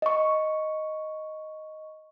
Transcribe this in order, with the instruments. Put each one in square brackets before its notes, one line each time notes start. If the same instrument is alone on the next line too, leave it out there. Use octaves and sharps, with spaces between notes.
[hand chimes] D#5 C#6